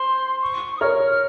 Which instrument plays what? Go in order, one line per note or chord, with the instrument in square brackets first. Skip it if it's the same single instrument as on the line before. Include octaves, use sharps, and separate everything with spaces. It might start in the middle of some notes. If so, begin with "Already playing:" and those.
Already playing: [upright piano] C5 [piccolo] C6
[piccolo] C#6
D#6
[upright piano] A#4 C#5 [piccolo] F6
[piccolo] F6